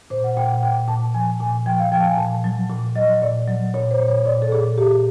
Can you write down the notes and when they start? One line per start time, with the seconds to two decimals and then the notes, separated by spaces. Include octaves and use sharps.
0.10 A#2 C5
0.24 F#5
0.37 A#2 G5
0.49 F#5
0.63 A#2 G5
0.88 A#2 A5
1.14 F3 G#5
1.40 A#2 G#5
1.66 F3 G5
1.80 F5
1.92 F3 G5
2.00 A5
2.05 G#5
2.18 A#2 A5
2.44 F#3
2.70 A#2
2.96 F#3 D#5
3.22 A#2 D5
3.48 F#3
3.74 A#2 C#5
3.91 C5
4.00 A#2
4.08 C#5
4.25 A#2 D5
4.42 A4
4.52 A#2 G#4
4.78 A#2 G4